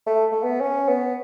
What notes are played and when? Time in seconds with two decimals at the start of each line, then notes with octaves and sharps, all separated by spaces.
0.06 A3
0.32 A3
0.43 B3
0.61 C#4
0.88 B3